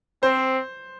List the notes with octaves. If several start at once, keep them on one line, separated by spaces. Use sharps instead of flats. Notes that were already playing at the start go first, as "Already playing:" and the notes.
C4 C5